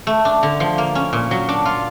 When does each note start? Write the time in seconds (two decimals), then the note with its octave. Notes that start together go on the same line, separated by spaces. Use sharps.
0.07 A3
0.25 D4
0.43 D3
0.60 F3
0.78 A#3
0.95 C#4
1.13 A#2
1.31 F#3
1.49 D4
1.65 F4